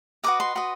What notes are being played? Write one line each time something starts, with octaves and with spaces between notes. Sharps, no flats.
F#4 B4 D#5 D6
C6
F#4 B4 D#5